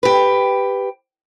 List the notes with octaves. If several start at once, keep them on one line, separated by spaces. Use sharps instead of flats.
G4 B4